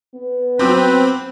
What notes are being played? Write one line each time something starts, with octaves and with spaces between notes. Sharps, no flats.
B3
F#3 C4 B4 D6 G6